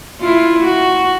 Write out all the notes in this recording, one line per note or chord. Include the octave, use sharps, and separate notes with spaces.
E4 F4
F#4